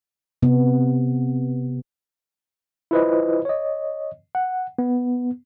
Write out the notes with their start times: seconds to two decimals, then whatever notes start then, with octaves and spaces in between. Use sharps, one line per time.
0.43 C3 B3
2.91 E4 F4 B4 C5 D#5
3.45 C#5 D#5
4.35 F#5
4.79 B3